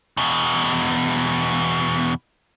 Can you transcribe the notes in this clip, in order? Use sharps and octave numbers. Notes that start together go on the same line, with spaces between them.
E2 B2